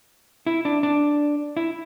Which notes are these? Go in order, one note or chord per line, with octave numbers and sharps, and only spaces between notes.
E4
D4
D4
E4